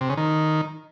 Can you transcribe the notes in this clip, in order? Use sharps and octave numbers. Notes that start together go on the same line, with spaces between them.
C3
C#3
D#3